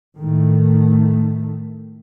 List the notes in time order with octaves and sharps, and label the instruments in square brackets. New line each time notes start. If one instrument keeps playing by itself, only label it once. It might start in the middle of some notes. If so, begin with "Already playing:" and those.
[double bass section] A2 D#3 A3